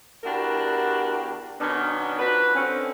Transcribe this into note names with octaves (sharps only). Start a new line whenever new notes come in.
E2 D4 E4 F#4 G4 A#4
B2 D#3 B3 C#4 D4
F3 D4 F#4 B4
D3 C4 C#4